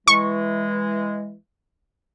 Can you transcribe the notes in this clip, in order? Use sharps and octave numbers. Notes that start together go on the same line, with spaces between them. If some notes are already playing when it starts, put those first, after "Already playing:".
E3 G#3 C#6